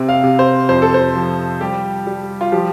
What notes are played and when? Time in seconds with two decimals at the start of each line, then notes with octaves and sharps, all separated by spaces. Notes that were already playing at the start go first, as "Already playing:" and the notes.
Already playing: C3 C4
0.09 F5
0.23 C3
0.39 C5
0.69 F2 C5
0.82 A4
0.94 C5
1.15 F3
1.61 G3 G4
2.07 G3
2.41 F4
2.52 F3 G4